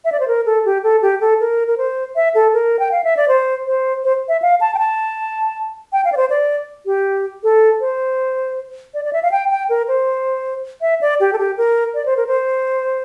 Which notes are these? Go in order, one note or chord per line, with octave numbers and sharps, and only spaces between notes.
E5
D5
C5
A#4
A4
G4
A4
G4
A4
A#4
A#4
C5
E5
A4
A#4
G5
F5
E5
D5
C5
C5
C5
E5
F5
A5
G5
A5
G5
F5
D5
C5
D5
G4
A4
C5
D5
D5
E5
F5
G5
G5
A#4
C5
E5
D5
G4
A4
G4
A#4
D5
C5
A#4
C5